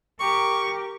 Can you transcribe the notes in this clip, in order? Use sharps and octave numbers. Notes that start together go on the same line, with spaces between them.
G4 A#4 C#6